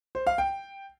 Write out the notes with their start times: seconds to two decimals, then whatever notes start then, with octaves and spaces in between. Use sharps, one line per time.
0.15 C5
0.27 F5
0.38 G5